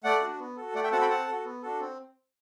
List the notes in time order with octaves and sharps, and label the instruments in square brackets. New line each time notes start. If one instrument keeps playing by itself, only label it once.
[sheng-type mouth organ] A3 D5 F#5
D4 F#4
B3
F#4 A4
A3 D5 F#5
E5 G5
C4 F#4 A4 F#5 A5
G5 B5
C4 F#5 A5
F#4 A4
B3
D4 F#4 A4
C4